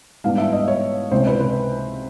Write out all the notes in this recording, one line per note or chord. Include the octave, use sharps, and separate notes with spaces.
G#2 E3 G3 B3 D4 F5
E5
D#5
C#5
C#2 C3 E3 C5
B4
B4